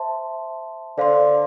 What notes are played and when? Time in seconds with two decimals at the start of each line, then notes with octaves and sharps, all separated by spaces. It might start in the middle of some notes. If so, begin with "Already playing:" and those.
Already playing: C5 E5 A5 C6
0.98 D3 C5 F5 C6